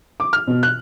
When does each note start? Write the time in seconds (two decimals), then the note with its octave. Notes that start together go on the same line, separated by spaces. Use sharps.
0.20 D6
0.33 F6
0.47 B2
0.63 F#6